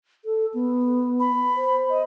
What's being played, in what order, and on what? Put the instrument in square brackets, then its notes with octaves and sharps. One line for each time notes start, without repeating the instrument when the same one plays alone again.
[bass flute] A4
B3
[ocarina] B5
[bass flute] C5
[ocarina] D#5